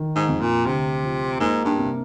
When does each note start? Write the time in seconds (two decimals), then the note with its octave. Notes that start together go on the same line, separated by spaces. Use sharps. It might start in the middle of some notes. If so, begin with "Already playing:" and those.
Already playing: D#3
0.16 G#2
0.28 F2
0.41 A#2
0.65 D2 C3
1.03 F3
1.40 G#2 A#3
1.65 G2
1.78 C3